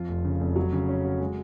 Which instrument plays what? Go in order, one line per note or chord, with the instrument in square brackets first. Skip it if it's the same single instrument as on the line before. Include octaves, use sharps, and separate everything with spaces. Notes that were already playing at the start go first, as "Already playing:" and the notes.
Already playing: [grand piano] F2 F4
F1
C#3
F1
F#3
C#3
C#4
F#4
G#3